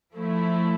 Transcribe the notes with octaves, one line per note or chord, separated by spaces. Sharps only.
F3 A3 E4